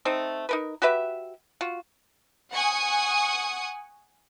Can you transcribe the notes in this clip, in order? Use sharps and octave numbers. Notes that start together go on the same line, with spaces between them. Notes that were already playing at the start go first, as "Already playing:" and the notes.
A3 C4 D#4
D#4 A#4 B4
F#4 G4 B4 E5
F4 F#4
F#5 G#5 C#6 D#6